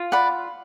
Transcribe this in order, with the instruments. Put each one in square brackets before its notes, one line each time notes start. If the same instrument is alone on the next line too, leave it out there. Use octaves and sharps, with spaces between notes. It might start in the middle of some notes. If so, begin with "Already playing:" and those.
Already playing: [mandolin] F4
[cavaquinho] D5 F#5 B5